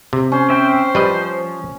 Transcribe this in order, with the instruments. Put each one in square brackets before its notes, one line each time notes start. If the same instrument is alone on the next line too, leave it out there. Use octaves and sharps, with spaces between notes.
[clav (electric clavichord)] C3
[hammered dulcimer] C#4 [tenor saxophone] C5
[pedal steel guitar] C4 E5 G5 [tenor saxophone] C5
[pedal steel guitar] F3 [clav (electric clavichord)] G3 B4 D#5